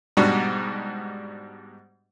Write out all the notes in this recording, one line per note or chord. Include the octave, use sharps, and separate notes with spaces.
G#2 B2 G3 D4 F#4